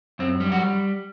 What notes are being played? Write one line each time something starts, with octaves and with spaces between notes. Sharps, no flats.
F#2 C4
G3
F#3 F#4